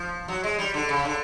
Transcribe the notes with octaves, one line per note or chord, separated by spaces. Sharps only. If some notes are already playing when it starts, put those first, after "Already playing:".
Already playing: F3
F#3
G#3
G3
D3
C#3
D3